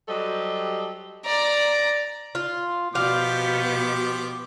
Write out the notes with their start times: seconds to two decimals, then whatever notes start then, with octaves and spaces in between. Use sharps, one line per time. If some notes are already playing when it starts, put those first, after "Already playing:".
0.09 F#3 G3 G4 A4 C5 D#5
1.25 D5 A#5
2.35 F4
2.95 B2 F3 B3 F#4 G4 F5 D6